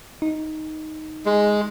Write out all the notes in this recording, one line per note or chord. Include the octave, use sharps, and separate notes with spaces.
D#4
G#3